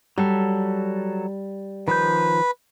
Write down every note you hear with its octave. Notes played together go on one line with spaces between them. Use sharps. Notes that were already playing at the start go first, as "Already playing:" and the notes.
F#3 G3 A4
D#3 F3 B4 G6